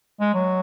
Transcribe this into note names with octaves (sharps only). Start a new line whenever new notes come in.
G#3
F#3